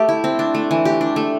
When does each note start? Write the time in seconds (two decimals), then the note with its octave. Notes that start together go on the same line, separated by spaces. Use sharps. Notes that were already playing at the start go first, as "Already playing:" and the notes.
Already playing: A3 G4
0.09 E4
0.24 C4
0.39 D4
0.55 A3
0.71 E3
0.85 G4
1.01 D4
1.16 A3